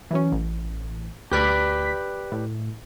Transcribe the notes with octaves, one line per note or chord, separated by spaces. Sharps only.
E3 F#3 C#4
A1
D2 G4 B4 D5 B6
A2